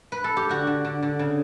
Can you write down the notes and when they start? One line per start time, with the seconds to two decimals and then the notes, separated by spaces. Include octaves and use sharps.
0.12 B4
0.24 A4
0.37 G4
0.49 D3 F#4
0.67 D3
0.85 D3
1.03 D3
1.19 C#3